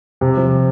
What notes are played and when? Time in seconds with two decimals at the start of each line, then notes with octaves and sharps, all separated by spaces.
0.21 C3
0.37 F3